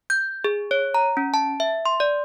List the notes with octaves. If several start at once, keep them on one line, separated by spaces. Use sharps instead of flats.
G6
G#4
C#5
A#5
C#4
A5
E5
C6
D5